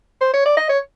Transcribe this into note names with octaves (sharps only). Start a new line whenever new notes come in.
C5
C#5
D5
D#5
C#5